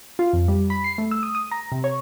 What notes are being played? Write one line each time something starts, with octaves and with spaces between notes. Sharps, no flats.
F4
F2
G3
B5
C7
A3
E6
D#6
D#6
A#5
C3
C#5